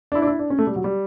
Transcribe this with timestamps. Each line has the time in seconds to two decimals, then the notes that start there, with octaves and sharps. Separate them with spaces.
0.12 D4
0.15 E4
0.22 D4
0.27 E4
0.39 D4
0.50 C#4
0.59 A3
0.67 G3
0.76 F#3
0.84 G3